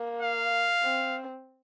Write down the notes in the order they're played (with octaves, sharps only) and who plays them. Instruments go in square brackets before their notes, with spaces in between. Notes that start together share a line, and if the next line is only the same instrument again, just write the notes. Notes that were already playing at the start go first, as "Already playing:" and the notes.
Already playing: [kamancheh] A#3
[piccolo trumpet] F5
[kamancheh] C4